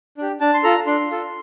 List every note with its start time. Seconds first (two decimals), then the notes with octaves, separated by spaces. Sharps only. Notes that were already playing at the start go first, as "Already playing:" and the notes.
0.17 D4 G4
0.40 D4 A5
0.54 C6
0.64 F4 A4 A#5
0.86 D4 C6
1.10 F4 A4